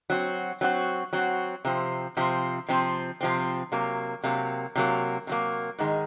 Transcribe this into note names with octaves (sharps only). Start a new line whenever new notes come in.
F#3 C4 F#4
F#3 C4 F#4
F#3 C4 F#4
C3 F3 C4
C3 F3 C4
C3 F3 C4
C3 F3 C4
C3 F#3 A#3
C3 F#3 A#3
C3 F#3 A#3
C3 F#3 A#3
G#2 D#3 G#3